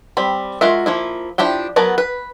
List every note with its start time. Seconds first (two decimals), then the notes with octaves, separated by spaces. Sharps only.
0.17 G3 C4 B5
0.61 G#3 F4 F#4 A#4 E5
0.86 F3 A#3 E4
1.38 F3 D4 E4 G4 G5
1.76 F#3 B3 A#4 B4 A5
1.98 B4